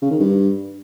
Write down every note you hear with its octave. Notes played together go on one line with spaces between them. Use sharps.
C#3
D#3
G2